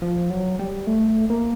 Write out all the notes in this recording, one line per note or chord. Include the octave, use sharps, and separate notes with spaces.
F3
F#3
G3
A3
A#3